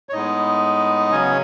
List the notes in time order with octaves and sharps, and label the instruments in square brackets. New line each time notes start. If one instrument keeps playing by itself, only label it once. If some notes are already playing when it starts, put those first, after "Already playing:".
[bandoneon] C#5
A2 G#3 B3 D#4 D#5
C#3 F#3 B3 C#4 C#5